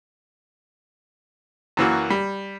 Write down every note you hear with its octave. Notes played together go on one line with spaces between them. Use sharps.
F#2 E3 A#3 F#4
G3